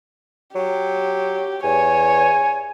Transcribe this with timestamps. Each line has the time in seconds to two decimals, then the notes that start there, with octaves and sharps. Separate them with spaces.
0.55 F#3 G4
1.64 E2 C#5 G#5